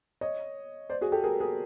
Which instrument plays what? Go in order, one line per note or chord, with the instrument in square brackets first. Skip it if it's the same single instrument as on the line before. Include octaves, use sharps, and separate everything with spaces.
[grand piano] C#5 D#5
C5 D5
F#4 G#4
G4 A4
G#4 A#4
G#4 A#4